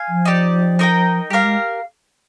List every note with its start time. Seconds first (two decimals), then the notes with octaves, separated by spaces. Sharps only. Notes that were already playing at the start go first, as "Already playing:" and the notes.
Already playing: F5 G#5
0.09 F3
0.25 D#4 G4 D5
0.79 D#4 A#4 D#5 G5
1.30 G3 G4 A#4 F5
1.44 G#3